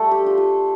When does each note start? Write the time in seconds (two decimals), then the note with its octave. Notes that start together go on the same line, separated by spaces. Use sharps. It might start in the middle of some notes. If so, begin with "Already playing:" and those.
Already playing: G3 A3 F4 A4
0.11 G4
0.24 D4 F4
0.38 F4